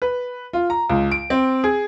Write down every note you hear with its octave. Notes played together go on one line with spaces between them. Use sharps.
B4
F4
A#5
C#2
D7
C4
G#4